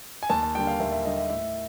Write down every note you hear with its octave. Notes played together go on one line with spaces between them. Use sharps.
G#5
D#2 A5
A5
D3 G3 A#3 G5
F5
D#2 E5
E5
D3 G3 A#3 D#5
E5
A2 E5